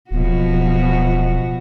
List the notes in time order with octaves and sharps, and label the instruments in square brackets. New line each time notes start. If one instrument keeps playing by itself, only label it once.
[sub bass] D1 [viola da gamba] B2 F3 F#4